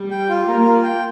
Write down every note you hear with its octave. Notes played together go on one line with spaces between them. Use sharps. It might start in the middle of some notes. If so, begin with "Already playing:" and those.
Already playing: G3
G5
F4
A#3 A#4
F4
G5